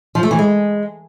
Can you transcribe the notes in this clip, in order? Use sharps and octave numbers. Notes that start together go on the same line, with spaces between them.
F3
A3
E3
G#3